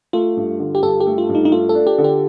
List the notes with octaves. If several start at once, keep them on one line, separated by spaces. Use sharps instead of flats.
A3 F4
G2
D3
G4
G2 A4
G4
A3
F4
G2
D#4
D#4
A3 F4
A4
D4
G4
D3
G4